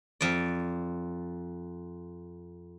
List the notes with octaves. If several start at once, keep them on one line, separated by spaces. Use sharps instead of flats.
F2 D5